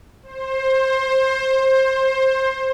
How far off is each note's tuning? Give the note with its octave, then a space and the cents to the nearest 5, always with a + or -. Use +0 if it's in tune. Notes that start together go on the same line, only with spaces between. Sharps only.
C5 +20